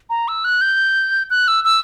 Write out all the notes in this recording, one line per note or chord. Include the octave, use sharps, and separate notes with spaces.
A#5
E6
F#6
G6
F#6
E6
E6